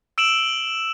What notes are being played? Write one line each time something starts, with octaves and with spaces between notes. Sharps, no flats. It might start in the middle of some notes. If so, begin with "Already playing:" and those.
E6 D7 E7 F#7